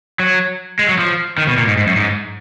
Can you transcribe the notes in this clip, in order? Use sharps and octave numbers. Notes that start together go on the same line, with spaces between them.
F#3
G#3
F#3
F3
D#3
B2
A#2
G#2
G#2
F#2
G#2